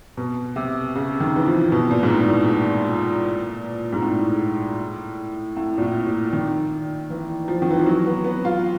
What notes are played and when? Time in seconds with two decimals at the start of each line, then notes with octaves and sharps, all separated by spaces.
0.17 B2
0.56 C3
0.95 C#3
1.20 D#3
1.36 E3
1.46 F3
1.72 B2
1.91 A#2
2.03 G#2
2.10 A2
2.29 A#2
3.93 G#2
4.02 A2
5.57 A2
5.78 A#2
5.82 A2
6.07 A#2
6.33 D#3
7.10 E3
7.48 F3
7.62 D#3
7.70 E3
7.79 F3
7.86 F#3
8.06 B3
8.24 B3
8.45 F4